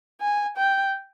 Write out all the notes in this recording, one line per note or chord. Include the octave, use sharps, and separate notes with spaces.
G#5
G5